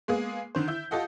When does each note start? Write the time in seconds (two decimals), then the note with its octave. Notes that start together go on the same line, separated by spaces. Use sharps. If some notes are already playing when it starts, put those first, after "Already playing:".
0.08 G#3 A#3 B3 G#4
0.55 D3 D#3 C5
0.68 E4 E5 G6
0.91 F4 G4 A4 D#5 F#5